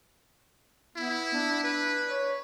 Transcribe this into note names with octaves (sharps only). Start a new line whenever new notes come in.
B3 E4
D4
B4
C#5